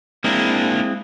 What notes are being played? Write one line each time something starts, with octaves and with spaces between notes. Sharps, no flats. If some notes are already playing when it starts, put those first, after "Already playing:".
G#3 A#3 C4 D4 E4